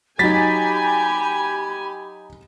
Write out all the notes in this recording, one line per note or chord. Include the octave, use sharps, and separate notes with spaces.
F#3 D#4 G4 G#5 B5 A6 B6